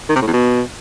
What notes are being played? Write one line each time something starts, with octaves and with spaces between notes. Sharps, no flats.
D#3
C3
A2
E2
B2